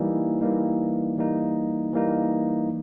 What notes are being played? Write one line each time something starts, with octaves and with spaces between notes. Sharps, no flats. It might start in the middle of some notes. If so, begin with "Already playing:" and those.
Already playing: E3 G3 A#3 D#4
E3 G3 A#3 D#4
E3 G3 A#3 D#4
E3 G3 A#3 D#4